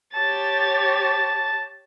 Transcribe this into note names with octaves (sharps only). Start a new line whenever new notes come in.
G4 C#5 A5 A6
A5